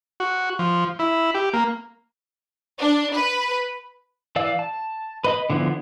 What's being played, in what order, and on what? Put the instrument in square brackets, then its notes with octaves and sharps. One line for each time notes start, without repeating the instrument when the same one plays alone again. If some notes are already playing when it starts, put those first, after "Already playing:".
[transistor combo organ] F#4
F3
E4
G4
A#3
[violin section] D4
B4
[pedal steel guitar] E3 D5 F5 E6
A5
B4 D#5 B5
D3 E3 F3 B3 E4